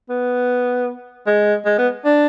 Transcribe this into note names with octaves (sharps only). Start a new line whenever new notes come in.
B3
G#3
G#3
B3
D4